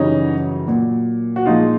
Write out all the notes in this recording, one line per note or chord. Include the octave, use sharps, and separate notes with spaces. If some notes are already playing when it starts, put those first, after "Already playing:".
Already playing: F#2 C#3 E3 G3 C#4 D#4
A#2 F#3
F#4
A#2 F3 G#3 D#4 F4